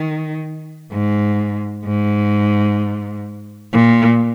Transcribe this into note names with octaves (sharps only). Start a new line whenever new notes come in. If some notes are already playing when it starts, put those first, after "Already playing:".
Already playing: D#3
G#2
G#2
A#2